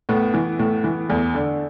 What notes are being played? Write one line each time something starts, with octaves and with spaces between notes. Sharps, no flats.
A2 B3
E3
A2
E3
E2 A3
D3